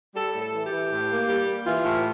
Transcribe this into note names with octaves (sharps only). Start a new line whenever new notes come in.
G3 A4
A2
A4
E3
G4
E3
A2
A#3
G3
A#3
E3 F4
A2